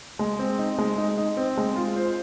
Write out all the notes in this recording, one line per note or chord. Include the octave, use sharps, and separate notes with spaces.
G#3
C4
D#4
G#3
D#4
D#4
C4
G#3
F4
C5